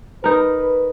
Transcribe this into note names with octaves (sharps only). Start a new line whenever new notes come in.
D#4 A#4 B4